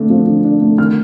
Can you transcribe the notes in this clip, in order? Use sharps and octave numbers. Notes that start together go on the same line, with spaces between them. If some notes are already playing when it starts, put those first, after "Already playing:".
Already playing: D3 A3 D4
F3
D3
D4
A3
D#3 F6